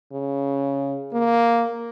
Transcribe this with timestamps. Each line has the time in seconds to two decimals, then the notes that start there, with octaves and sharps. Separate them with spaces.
0.13 C#3
1.13 A#3